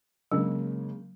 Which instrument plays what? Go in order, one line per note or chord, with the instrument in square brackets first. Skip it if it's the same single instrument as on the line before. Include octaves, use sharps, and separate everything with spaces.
[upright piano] C#3 G#3 A#3 [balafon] F#3